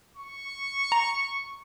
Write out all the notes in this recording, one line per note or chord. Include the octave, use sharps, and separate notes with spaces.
C#6
A#5